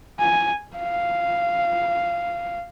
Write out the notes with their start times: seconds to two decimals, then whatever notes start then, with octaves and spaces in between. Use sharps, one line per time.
0.20 G#5
0.77 F5